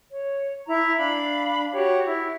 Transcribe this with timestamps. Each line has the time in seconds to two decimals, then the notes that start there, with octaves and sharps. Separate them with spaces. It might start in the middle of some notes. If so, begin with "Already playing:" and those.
0.11 C#5
0.66 E4 A#5
0.97 D4 F5 B5
1.73 F#4 G4 C#5
2.04 E4